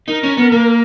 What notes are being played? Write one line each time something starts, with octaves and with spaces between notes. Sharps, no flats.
D#4 A#4
C#4
B3
A#3